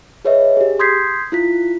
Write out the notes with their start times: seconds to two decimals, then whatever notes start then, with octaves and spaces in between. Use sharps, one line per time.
0.25 G#4 B4 C#5 D#5 E5
0.57 G4 G#4
0.79 C6 D#6 G6 G#6 B6 C7
1.32 E4 F4 B6